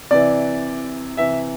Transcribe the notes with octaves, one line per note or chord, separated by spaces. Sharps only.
C3 E3 D5
C3 E3 E5